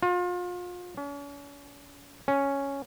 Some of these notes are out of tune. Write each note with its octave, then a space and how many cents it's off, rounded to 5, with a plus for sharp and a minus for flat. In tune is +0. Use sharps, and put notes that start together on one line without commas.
F4 +35
C#4 +40
C#4 +0